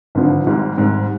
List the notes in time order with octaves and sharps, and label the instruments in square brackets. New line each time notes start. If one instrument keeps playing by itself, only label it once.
[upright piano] G#1 G2 D3 F3
G#1 G#2 G3
G#1 G#2 G3